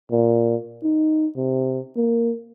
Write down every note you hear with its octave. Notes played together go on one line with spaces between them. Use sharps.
A#2
D#4
C3
A#3